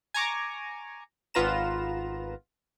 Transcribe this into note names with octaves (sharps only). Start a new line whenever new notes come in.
G#5 A#5 C#6 D6
G#1 B3 F4 B4 A#5 E7